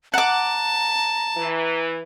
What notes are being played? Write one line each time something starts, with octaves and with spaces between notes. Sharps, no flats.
F#5 A5 A#5 D6
E3